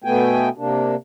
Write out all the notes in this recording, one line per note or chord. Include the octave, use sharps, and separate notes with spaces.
B2 A3 B3 G5 G#5
C3 A#3 D4